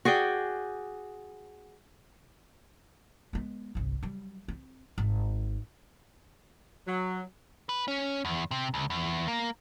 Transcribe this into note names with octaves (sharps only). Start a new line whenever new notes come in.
F#4 G#4 D5 G5
G#3 B3
G1 C2
F#3 G3
C4
G#1
F#3
B4
C#4
E2
C3
C#2
E2
A#3